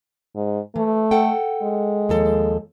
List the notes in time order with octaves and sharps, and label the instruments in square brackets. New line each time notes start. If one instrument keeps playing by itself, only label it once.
[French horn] G#2
[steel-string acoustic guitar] E3 [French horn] A3
[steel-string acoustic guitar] A4 F#5 G5
[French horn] G#3
[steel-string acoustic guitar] D#2 F3 A4